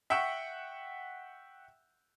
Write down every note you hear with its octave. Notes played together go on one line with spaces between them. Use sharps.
E5 F#5 G5 C#6 E6